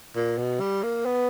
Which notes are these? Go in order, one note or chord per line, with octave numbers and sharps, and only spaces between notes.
A#2
B2
G3
A#3
B3